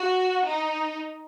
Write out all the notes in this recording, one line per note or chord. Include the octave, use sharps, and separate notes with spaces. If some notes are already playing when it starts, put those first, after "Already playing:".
Already playing: F#4
D#4